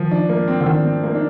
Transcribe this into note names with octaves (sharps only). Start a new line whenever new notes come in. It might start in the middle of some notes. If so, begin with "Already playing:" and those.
Already playing: D#3 F3
D4
A#3
C4
D3
D#3 D4
C4
A#3
D4